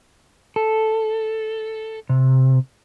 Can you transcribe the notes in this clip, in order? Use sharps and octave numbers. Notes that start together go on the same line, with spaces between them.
A4
C3